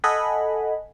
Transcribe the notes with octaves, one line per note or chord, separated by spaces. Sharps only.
A4 D#5 F#5 G#5 B5